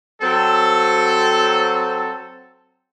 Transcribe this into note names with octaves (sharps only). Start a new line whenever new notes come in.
F#3 C4 A4